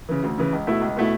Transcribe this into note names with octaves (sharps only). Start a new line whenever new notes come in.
C#3 E3
D2
C#3 E3
C#2
B2 A3 E4
C#2
B2 A3 E4